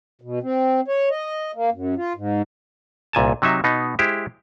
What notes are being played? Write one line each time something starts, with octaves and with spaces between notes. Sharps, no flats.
B2
C4
C#5
D#5
A#3
F#2
F4
G#2
C2 A#2 G#5 A5
C3 F#3 D#4 E5
B2 B3 D#4
G#3 E4 G4 C5